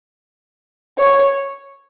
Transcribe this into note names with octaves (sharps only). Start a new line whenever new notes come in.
C#5